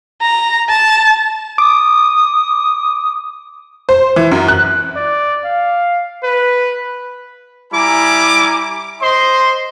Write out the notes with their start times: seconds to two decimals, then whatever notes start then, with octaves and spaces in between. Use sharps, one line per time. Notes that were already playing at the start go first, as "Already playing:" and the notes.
0.21 A#5
0.69 A5
1.58 D6 D#6
3.89 C5
4.16 E3
4.31 F#2
4.48 F#6
4.96 D5
5.45 F5
6.24 B4
7.72 G3 E4 G#5 A#5 D6
9.01 C5 D#5 C6